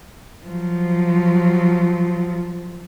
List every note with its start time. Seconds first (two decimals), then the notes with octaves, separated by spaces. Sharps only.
0.47 F3 F#3